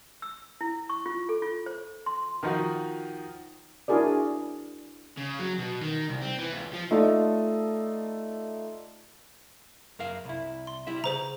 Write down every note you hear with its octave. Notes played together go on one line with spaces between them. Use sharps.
E6
E4
C#6
F4
A4
F4
C5
C6
D#3 F3 D#4 F#4
D4 E4 F#4 G#4 A#4 D5
C#3
F#3
B2
D#3
C2
C4
E3
C#2
F3
A3 D#4 F4 A4 D5 D#5
F#2 A#4 F5
C2 E4
C6
G3 E4 E5
C#3 G#4 C5 A#5